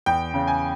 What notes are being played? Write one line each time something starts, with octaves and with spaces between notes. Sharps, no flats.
E2 G5
C#3
G#5